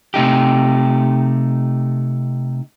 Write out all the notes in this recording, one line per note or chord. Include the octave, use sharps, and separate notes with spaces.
C3 A3 D#4 G4